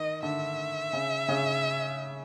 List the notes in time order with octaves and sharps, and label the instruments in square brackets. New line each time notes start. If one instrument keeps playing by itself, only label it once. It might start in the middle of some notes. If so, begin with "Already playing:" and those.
Already playing: [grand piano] D#3 [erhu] D#5
[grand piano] D3 [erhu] E5
[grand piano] C#3
C#3